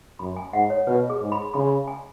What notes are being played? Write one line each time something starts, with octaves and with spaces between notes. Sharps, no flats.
F#2 B5
G#5
G#2 F#5
C#5
B2 B4
G#4
G#2
B5
C#3 B5
G#5